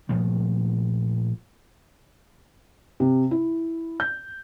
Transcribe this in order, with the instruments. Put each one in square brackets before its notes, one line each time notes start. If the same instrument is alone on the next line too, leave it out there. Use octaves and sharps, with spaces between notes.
[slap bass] A#2 F3 G3 A3
[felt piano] C3
E4
G6